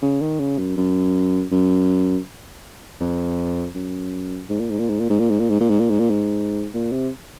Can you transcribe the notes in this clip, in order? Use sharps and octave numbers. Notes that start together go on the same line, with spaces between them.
C#3
D#3
C#3
F#2
F#2
F#2
F2
F#2
G#2
A#2
G#2
A#2
G#2
A#2
G#2
A#2
G#2
A#2
G#2
A#2
G#2
A#2
G#2
A#2
G#2
A#2
C3